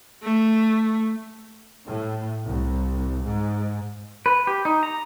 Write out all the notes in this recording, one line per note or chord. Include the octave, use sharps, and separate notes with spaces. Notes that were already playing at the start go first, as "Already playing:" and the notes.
A3
A2
C2
G#2
B4
G4
D#4
A#5